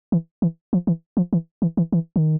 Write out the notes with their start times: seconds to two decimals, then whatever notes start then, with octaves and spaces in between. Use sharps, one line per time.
0.12 E3
0.42 E3
0.73 F3
0.87 E3
1.17 F3
1.33 E3
1.62 E3
1.77 E3
1.92 E3
2.16 D#3